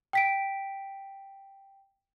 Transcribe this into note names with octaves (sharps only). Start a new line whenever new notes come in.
G5 B6 D7